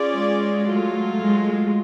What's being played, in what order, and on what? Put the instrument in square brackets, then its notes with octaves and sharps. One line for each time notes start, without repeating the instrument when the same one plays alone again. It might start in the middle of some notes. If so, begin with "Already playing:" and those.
Already playing: [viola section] C#4 F4 G#4 D5
[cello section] G#3
[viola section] F#3 A3 F4
[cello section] G#3